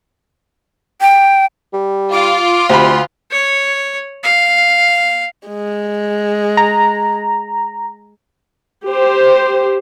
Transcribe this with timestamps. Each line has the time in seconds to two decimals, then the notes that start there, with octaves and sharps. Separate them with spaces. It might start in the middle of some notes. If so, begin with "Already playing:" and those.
1.01 G5
1.73 G3
2.12 F4 D6
2.69 D2 C3 B5 C6
3.31 C#5
4.24 F5
5.48 G#3
6.57 A#5
8.87 G4 C5